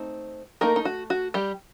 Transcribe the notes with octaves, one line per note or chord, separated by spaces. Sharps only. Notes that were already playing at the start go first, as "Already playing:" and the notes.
Already playing: A3 C4 D#4
A3 A#3 D#4 A#4
D#4
F#4
F#4
G3 G4